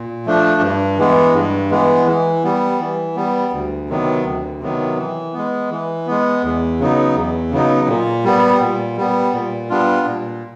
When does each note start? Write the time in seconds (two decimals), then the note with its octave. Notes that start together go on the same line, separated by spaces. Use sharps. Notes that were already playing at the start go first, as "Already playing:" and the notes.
Already playing: A#2
0.26 F3 A3 D4
0.61 G2
0.98 E3 G#3 B3
1.34 G2
1.70 E3 G#3 B3
2.07 E3
2.44 G3 B3
2.80 E3
3.16 G3 B3
3.53 D2
3.89 C3 D#3 F#3 B3
4.25 D2
4.61 C3 D#3 F#3 B3
4.98 E3
5.33 G#3 B3
5.71 E3
6.07 G#3 B3
6.44 E2
6.80 C#3 F#3 B3 D#4
7.16 E2
7.51 C#3 F#3 B3 D#4
7.88 A#2
8.24 G3 B3
8.60 A#2
8.97 G3 B3
9.33 A#2
9.70 G3 B3 D4 F4
10.07 A#2